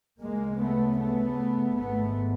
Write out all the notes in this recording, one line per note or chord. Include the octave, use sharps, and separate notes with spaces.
D2 C#3 G#3 A#3
A3 B3
A3 B3
G#1 G#2 A3 B3